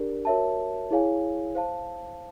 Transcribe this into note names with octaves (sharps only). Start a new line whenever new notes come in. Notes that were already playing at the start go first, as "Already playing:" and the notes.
Already playing: D4 G4 A#4 D5
F#4 A#4 C#5 E5 A5
E4 G#4 C#5 F5 G#5
C5 F5 A5